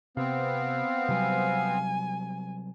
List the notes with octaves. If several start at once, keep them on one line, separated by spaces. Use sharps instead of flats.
C3 B3 C4 F5
C3 F#3 G3 G#5